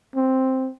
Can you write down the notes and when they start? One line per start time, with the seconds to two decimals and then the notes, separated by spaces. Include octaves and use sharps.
0.15 C4